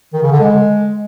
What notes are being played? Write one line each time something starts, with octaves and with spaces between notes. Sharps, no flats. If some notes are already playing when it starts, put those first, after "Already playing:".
D#3
C#3
D3
G#3